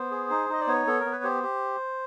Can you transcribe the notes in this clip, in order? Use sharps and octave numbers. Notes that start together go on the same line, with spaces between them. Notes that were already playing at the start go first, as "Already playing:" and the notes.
Already playing: B3 C5
G#4
D#4
D#4 D#5
D5
B3 C#5
B3 A4
A#4
B3
B4
G4 C5
G4